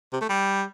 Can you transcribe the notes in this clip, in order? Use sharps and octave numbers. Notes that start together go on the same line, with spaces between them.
C3
A3
G3